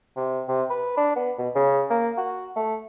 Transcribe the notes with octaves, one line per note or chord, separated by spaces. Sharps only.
C3
C3
B4
D4
B3
B2
C#3
A#3
F#4
A3